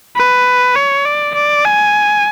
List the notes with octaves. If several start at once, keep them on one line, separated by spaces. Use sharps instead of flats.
B4
C#5
D5
D5
G#5